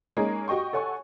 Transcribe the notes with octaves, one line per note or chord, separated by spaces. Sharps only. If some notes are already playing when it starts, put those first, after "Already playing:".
G#3 A#3 C#4 D#4 G#4 A#4
F#4 G4 D#5 G5 C#6
A4 C#5 F#5 G#5 C#6